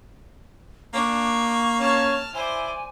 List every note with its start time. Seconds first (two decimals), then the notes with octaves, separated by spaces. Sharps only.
0.94 A#3 D4 C#6
1.80 C#4 A5 F6
2.35 E4 C5 D5 G#5